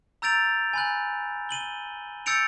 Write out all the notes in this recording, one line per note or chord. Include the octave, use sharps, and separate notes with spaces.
A#5 E6 G6 A6 D7 F7
G#5 B5 F#6
D#7 F#7 G7
E6 G6 A6 C#7 D7 F7